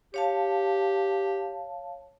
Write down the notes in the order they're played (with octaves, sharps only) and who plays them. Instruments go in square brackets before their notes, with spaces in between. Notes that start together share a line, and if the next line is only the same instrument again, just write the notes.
[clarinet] G4 [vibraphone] C#5 F5 A5